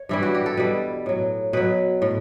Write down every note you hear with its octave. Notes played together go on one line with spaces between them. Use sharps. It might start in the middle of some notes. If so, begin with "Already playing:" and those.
Already playing: C#5
G2 E3 G3 E4
F#4
G4
A4
B2 G3 B4
A2 F#3
B2 F#3 B4
A2